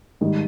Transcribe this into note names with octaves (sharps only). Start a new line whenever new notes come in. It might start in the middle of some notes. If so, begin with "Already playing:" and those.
G#2 D#3 G3